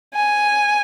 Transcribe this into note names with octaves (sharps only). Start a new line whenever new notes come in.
G#5